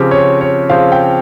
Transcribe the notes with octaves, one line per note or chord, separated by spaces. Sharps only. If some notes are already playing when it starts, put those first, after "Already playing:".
Already playing: C#3 F3 C4 G4
C#5
C#5
C#3 F3 C4 F5
G5